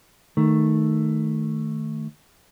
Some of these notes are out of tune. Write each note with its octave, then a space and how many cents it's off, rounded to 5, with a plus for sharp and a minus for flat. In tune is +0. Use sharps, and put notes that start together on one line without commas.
D#3 +0 A3 +0